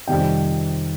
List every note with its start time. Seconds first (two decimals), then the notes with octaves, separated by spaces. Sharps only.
0.07 F2 C3 D#3 G3 G5